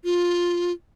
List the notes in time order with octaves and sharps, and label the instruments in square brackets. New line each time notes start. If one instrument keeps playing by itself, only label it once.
[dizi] F4